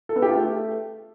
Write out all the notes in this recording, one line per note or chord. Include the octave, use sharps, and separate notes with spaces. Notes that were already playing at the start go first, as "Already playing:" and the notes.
A4
B3
G4
F4
A3